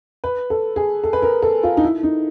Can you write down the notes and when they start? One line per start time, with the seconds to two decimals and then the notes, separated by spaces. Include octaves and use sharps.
0.24 B4
0.50 A4
0.76 G#4
1.04 A4
1.13 B4
1.22 A#4
1.42 A4
1.63 F4
1.77 D#4
1.83 E4
2.03 D#4